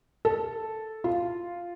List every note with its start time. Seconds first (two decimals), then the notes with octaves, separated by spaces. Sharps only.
0.25 A4
1.04 F4